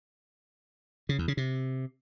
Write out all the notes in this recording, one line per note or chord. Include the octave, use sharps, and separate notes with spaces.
C#3
E2
C#3
C3